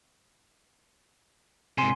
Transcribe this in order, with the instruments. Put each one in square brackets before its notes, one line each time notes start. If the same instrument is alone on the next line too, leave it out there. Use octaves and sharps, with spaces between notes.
[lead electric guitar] G#2 C3 [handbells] G#5 C6